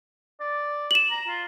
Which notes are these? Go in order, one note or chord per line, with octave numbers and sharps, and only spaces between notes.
D5
E7 F#7
A#5
F4